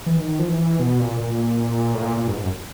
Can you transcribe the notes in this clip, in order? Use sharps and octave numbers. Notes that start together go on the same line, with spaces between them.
E3
D#3
F3
E3
B2
A#2
A#2
A2
A#2
A#2
G2
G#2
F#2